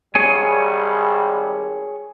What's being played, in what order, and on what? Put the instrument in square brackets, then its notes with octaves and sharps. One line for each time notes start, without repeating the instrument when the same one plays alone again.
[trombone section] G#1 G3 [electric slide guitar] G#4 C#5 G#5